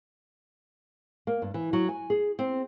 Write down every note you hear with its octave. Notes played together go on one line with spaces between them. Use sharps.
A#3
G2
E3
F#3
G#5
G#4
C4